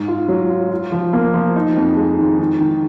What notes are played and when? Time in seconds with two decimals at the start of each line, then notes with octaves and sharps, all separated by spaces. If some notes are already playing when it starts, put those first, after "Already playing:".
Already playing: G#2
0.08 F4
0.28 F#3
0.50 F4
0.71 F4
0.92 F3
1.13 A#3
1.34 F3
1.56 D#4
1.76 F2
1.97 G#3
2.18 D#3
2.39 D#3
2.60 D#3